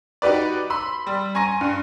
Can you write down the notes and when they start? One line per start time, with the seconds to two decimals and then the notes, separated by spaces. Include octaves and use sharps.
0.22 D#4 F#4 G4 B4 D5
0.70 B5 C6 E6
1.07 G3
1.35 G#5 A#5 C6 C#6 A#6 D#7
1.61 G2